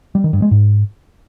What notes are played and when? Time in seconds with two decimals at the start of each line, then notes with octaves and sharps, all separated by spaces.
0.15 G3
0.24 D#3
0.33 G2
0.42 G#3
0.51 G#2